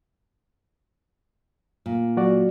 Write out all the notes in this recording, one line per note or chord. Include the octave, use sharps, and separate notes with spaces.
A#2
F#3 F#4 D5